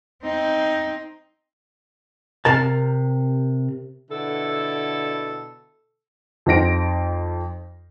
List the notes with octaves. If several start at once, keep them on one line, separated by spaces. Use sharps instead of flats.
C4 D#4
C3 A#4 A5
B2 D3 E4 A4
F2 D#4 C5 A#6 D7